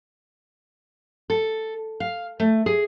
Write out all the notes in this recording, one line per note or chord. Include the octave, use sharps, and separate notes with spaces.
A4
F5
A3
G#4